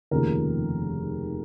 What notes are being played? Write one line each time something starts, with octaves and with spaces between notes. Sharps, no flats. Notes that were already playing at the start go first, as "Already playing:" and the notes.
F1 D#2 C#3 F3 A#4